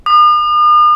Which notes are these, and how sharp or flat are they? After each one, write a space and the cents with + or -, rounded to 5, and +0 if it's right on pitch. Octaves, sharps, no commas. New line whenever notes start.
D#6 -45